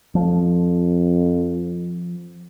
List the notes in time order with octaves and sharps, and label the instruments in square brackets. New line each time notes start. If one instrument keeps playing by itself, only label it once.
[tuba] F2 [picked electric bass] F3